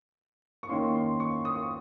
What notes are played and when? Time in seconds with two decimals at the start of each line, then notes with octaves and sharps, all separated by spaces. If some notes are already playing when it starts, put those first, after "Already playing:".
0.63 C#6
0.69 D#3 A#3 C#4 C6
0.95 C6
1.20 C#6
1.45 D#6
1.55 C#6